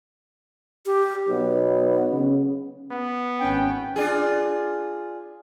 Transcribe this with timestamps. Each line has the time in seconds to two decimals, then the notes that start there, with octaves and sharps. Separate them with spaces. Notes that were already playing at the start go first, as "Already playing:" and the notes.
0.86 G4
1.28 B1 B3
2.11 C#3
2.91 B3
3.39 G#1 C#4 G5
3.96 D4 F4 G#4